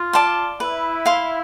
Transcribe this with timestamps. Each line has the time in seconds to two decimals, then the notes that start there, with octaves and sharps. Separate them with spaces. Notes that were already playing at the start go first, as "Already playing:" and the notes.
Already playing: F4
0.13 D5 A5 C6
0.60 E4 B4
1.06 F5 C6